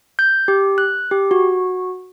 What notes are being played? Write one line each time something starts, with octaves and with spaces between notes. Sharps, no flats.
G6
G4
F#6
G4
F#4